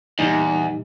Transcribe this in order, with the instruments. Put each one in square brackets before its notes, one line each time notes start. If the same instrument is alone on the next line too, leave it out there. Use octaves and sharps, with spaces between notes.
[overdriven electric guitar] E2 [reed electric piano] A#2 G3 D#4